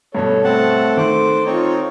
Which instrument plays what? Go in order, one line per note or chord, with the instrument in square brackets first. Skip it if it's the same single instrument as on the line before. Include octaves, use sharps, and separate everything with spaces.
[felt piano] G2 B2 G3 [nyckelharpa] A4 [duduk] C#5
[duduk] A3 [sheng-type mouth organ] C4 F#5 A5
[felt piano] D#3 [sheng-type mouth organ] C5 D6
[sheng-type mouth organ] C4 D#4 C#5 [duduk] F4